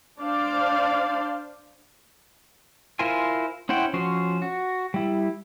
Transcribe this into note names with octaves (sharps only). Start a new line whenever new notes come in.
D4 C5 D5 F5
E4 F4 A#4 C5 G#5
C#4 E4 C5 F#5 G5
F3 C#4 F#4 C5
F#4
G3 E4